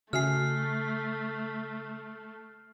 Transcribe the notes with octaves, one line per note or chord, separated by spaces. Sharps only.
C#3 A3 F#4 E5 G#5 F6 C7